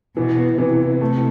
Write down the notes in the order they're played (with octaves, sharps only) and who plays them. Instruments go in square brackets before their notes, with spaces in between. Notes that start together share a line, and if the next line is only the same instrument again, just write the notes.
[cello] B2 [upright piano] E3
[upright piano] B3
[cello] C3 [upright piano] E3
[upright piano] E4
A3